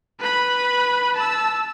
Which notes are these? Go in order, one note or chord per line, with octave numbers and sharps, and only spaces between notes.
B4 B5
A5 E6